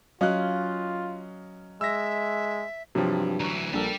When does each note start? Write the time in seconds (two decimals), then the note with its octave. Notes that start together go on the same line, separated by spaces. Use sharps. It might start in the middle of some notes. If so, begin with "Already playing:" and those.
0.21 F#3 C#4 F4 D#5 F5 F#6
1.81 G#3 E5 E6 A#6
2.95 G2 C3 F3 F#3
3.40 D2 E3 A#5 C#6
3.73 A#1 G3 D4 A4 A#4